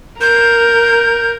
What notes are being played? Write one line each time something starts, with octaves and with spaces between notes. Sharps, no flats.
A#4 G6